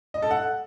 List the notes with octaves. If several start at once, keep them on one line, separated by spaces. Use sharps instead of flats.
D#5
A4
F#5